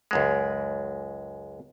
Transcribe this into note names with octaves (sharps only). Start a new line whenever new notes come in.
C#2 F#2 G#3